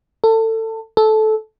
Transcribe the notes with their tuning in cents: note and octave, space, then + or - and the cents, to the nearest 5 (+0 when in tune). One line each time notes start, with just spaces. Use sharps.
A4 +25
A4 -15